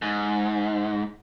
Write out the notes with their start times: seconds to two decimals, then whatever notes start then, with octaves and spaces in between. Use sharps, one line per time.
0.02 G#2